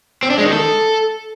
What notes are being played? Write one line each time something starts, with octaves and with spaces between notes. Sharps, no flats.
C4
D4
G#3
D#3
A4